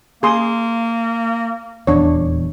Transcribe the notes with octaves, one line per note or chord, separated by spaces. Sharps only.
A#3 G#4 C6 D#6
D#1 E2 D4 C#5